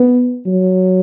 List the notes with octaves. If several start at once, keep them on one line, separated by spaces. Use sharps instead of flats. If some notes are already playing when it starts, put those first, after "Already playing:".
Already playing: B3
F#3